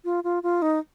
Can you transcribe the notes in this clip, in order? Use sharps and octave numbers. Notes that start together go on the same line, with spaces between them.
F4
F4
F4
D#4